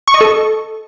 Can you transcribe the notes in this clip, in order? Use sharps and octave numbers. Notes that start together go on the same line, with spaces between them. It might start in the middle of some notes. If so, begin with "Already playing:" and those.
C#6
D#5
A4